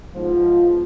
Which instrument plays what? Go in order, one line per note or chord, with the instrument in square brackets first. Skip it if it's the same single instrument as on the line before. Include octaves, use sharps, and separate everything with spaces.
[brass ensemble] G#2 B2 F3